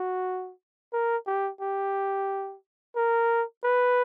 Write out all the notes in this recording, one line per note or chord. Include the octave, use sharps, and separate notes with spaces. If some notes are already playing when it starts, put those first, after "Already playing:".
Already playing: F#4
A#4
G4
G4
A#4
B4